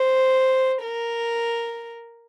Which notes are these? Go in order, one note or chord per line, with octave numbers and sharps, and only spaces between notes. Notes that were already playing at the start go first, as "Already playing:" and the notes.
Already playing: C5
A#4